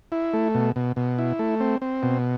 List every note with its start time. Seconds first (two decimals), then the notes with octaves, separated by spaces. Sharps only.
0.12 E4
0.34 A3
0.55 B2
0.76 B2
0.96 B2
1.19 E4
1.39 A3
1.60 C4
1.82 C4
2.03 B2